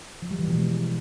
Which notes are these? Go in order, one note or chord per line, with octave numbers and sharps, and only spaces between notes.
F3
G3
E3
B2
G#3